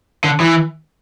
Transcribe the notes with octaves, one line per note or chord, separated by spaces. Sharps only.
D3
E3